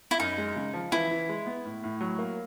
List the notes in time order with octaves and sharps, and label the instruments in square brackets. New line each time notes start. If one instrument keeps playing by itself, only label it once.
[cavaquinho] E4
[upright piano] F#2 [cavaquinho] D#4
[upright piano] G#3
C#3
F3
[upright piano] E3 [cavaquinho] E4
[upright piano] E3
G#3
B3
A2
A2
F#3
A#3